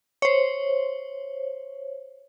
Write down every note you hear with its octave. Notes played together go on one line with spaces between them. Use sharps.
C5 C#5